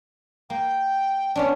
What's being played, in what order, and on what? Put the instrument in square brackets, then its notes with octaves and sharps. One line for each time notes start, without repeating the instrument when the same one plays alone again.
[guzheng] A#3 [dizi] G5
[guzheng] B3 C#4 D4